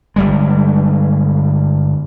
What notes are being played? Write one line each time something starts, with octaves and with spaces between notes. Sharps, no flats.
G1 G3 G#3